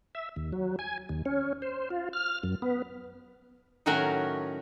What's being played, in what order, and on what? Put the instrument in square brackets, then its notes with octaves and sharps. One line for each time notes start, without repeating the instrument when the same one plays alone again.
[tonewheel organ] E5
D#2
F#3
G#5
D#2
C#4
C5
F4
F6
F#2
B3
[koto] A2 D#3 F#3 C#4 F#4 A#4